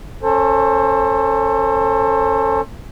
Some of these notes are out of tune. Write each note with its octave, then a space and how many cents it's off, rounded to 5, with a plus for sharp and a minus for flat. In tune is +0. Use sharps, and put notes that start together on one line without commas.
C#4 +0 A4 +20 C5 +25